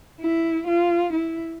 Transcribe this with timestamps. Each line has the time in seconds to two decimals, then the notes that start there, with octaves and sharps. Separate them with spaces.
0.20 E4
0.67 F4
1.13 E4